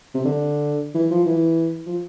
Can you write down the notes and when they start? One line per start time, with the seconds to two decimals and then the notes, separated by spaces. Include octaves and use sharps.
0.15 C3
0.25 D3
0.95 E3
1.11 F3
1.26 E3
1.87 F3